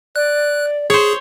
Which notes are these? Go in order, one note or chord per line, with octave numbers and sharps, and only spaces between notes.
D5 F#6
G#4 C5 C#5